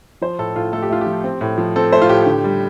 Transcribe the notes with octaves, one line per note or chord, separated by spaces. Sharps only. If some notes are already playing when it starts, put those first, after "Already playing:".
F3 C5
A2 A4
A2 F4
A3 A4
G4
A3 F4
G4
F3
C4
A2
F3
C4 A4
A3 C5
F4
A2 G4
D3
G3